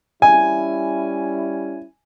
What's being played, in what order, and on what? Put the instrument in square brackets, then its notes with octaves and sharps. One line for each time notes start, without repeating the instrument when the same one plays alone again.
[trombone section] G3 C#4 E4 [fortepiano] G#5